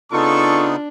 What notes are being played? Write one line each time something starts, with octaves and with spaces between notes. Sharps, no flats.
C#3 B3 D4 D#4 F4 A4 C#6